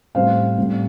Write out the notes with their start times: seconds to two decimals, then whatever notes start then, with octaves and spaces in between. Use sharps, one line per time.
0.15 A2 G3 C4 C5 F5
0.57 A2 G3 C4